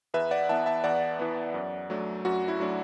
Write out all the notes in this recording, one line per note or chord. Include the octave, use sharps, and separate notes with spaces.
E2 B4 E5
D5 F#5
E3 B3 E5 A5
E5 A5
E2 D5 F#5
E3 B3
F#2
F#3 A3 D4
F#2 F#4
E4
F#3 A3 D4